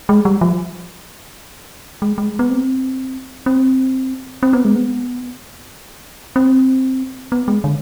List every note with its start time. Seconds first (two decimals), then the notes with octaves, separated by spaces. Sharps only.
0.09 G#3
0.25 G3
0.41 F3
2.02 G#3
2.18 G#3
2.39 B3
2.50 C4
3.46 C4
4.43 C4
4.53 B3
4.65 G#3
4.76 B3
6.36 C4
7.32 B3
7.48 G#3
7.64 D3